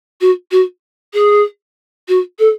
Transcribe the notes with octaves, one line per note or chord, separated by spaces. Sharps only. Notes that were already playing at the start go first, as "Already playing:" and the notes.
F#4
F#4
G#4
F#4
A4